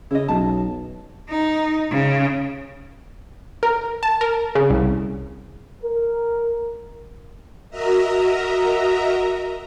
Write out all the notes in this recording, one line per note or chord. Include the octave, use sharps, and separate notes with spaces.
C#3 E4 D#5
B1 A5
D#4
C#3
A#4
A5
A#4
C#3
C2
A#4
F#4 A#4 D#5 E5 A#5